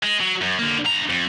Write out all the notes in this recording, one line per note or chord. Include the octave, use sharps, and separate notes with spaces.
G#3
F#3
F#2
D3 A#3
G2 A#5
F2